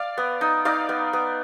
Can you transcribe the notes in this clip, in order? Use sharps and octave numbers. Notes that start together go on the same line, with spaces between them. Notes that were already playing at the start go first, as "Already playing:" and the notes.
Already playing: D5 F5
B3
D#4
D#4 D5 F5
B3
B3